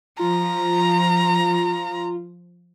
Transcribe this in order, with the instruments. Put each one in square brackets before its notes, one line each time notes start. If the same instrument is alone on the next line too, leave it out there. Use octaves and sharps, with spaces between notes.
[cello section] F3 [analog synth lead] F4 [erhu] A#5